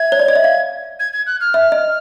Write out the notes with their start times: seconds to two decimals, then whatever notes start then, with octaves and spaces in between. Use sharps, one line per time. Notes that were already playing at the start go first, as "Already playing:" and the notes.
Already playing: E5 G#6
0.12 C#5
0.19 D5
0.28 D#5
0.35 E5
0.44 F5
0.99 G#6
1.13 G#6
1.27 F#6
1.41 F6
1.54 E5
1.72 D#5